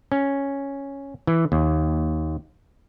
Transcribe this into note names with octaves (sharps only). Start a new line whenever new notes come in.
C#4
E3
D#2